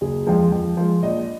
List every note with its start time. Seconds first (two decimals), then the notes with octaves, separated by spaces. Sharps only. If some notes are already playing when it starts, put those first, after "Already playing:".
0.01 F#1 G#4
0.26 F2 F3 G#3
0.52 F2
0.77 F3 G#3
1.03 A#1 D#5